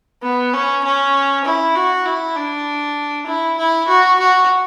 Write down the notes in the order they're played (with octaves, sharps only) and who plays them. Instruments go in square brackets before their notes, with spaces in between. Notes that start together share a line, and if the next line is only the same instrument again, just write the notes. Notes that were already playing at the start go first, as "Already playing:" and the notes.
[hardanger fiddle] B3
C#4
C#4
E4
F#4
E4
D4
E4
E4
F#4
F#4